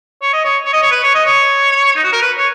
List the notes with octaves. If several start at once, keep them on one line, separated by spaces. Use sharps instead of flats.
C#5
D#5
C#5
C#5
D#5
C#5
B4
C#5
D#5
C#5
D#4
F#4
A#4
B4
C#5